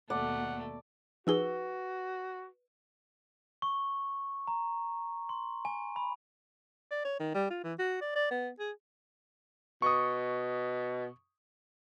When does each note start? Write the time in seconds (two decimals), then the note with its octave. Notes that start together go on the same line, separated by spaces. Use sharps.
0.10 D#2 B2 A3 D5 F#5
1.27 F3 D#4 F#4 G#4 B4 E6 G7
3.62 C#6
4.48 A#5
5.29 C6
5.65 G#5
5.96 B5
6.91 D5
7.05 C#5
7.20 D#3
7.35 G3
7.51 F4
7.64 E3
7.79 F#4
8.01 D5
8.16 D5
8.31 B3
8.59 G#4
9.82 B2 C#6 D#6